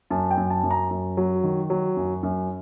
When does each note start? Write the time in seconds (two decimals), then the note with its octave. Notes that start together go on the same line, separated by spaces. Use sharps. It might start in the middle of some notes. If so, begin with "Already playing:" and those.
0.10 F#2 A5
0.31 G5
0.37 F#2
0.50 A5
0.64 F#2
0.71 A#5
0.91 F#2
1.17 F#3
1.44 D#3
1.70 F#3
1.97 F#2
2.23 F#2